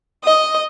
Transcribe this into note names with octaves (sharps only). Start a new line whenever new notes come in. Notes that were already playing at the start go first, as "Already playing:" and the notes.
D#5